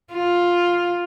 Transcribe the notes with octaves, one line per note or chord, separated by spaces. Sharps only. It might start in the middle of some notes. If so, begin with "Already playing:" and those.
F4